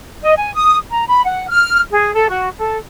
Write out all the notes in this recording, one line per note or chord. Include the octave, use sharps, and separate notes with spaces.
D#5
G#5
D#6
A#5
B5
F#5
F6
G#4
A4
F#4
A4